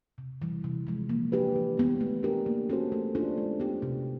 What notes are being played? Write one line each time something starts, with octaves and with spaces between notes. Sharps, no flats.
C3
E3 G3
C3
F3 G#3
A#3
D4 G4 B4
E3
G#3 B3
A3
D4 G4 A#4
A#3
C#4 F#4 A4 C5
A3
D4 F4 A4 C5
G#3
B3 D4 G4
C3